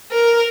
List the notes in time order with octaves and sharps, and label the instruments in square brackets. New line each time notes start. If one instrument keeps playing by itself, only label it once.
[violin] A#4